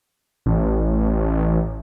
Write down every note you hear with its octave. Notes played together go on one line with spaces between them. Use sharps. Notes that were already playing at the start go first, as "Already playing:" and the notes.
A1